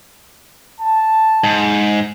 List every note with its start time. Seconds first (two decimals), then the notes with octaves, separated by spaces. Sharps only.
0.80 A5
1.44 G#2